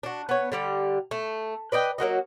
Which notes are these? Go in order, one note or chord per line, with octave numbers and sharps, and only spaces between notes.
D4 F#4
B3 C#5
D3 G3 G4
A3
B4 D5 D#5 G5
F#3 A#3 F#4 D#5